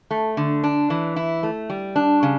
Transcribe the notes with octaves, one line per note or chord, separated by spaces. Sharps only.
A3
D3
D4
E3
E4
A3
G3
D4
C#3